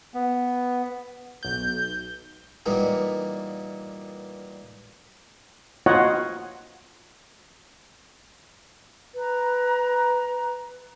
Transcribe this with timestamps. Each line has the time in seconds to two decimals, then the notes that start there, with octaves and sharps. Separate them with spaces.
0.14 B3
1.43 B1 G6
2.66 A#2 E3 G3 B3 D#4
5.86 F4 F#4 C#5 D#5 F#5
9.16 B4 A#5